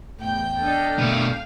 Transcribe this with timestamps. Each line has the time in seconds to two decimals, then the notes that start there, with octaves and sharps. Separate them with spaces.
0.20 E2 A2 G5 G6
0.60 D4 A4 D#5 F6 G6
0.98 B2 A3 F5